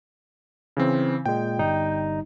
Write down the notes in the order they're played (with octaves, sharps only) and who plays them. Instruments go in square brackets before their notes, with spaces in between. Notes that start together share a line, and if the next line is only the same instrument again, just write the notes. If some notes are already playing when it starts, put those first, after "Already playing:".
[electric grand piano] C#3 E3 C4
[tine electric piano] A#2 G#3 [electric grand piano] G5
[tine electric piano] G1 G3 D#4